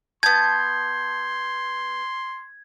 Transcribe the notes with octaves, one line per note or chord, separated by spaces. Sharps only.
B3 A5 C6 G6 G#6